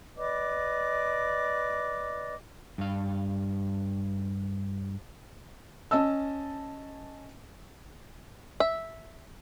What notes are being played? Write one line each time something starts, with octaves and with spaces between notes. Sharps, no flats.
B4 D5 D#5 D6
G2 F5
C#4 D#5 A5 E6
E5